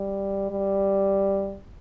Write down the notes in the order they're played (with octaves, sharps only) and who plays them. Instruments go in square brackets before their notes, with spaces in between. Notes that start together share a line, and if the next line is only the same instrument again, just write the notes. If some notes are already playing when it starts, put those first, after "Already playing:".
Already playing: [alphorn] G3
G3